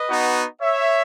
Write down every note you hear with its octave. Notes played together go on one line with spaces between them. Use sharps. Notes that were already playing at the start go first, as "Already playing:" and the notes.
Already playing: B4 D#5
B3 D#4 F#4
C#5 E5